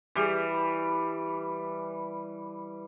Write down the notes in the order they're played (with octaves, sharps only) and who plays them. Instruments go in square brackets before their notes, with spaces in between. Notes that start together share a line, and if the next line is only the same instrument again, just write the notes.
[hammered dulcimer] E3 G3